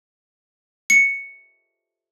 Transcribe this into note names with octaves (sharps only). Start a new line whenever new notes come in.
C#7